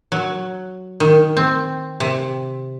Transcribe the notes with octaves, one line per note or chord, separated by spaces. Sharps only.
F#3
D#3
C4
C3